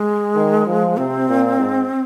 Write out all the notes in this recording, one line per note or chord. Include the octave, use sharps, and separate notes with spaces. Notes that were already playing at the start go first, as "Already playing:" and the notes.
Already playing: G#3
D#3
F3
C3 C4
A#2
G#2